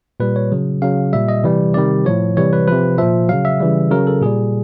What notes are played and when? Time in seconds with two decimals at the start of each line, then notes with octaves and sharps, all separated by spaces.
0.20 A#2 G3 B4
0.36 C#5
0.52 C#3 F#3
0.82 C#3 F#3 F5
1.13 A#2 G3 E5
1.28 D#5
1.44 C3 E3 G3
1.74 C3 D#3 G3 D5
2.05 A2 F3 C#5
2.37 C3 E3 G3 C#5
2.53 B4
2.67 C3 F3 B4
2.98 A#2 F3 E5
3.29 C#3 F#3 F5
3.45 E5
3.60 C#3 E3 G3
3.91 C#3 F#3 A#4
4.07 A4
4.22 A#2 G3 G#4